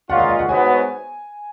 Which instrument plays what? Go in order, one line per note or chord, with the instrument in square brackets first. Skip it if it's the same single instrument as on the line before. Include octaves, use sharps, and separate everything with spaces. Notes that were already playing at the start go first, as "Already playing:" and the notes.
[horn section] A#2 G#3 C#4 F4 [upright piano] F#5
[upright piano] F5
D#5
F#5
[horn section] G#2 F#3 B3 F#4 [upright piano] G#5